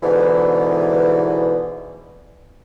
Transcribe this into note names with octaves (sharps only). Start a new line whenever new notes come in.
E2 G#2 B2 D3 E3